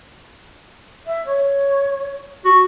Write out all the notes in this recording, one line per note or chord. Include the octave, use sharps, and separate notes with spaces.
E5
C#5
F#4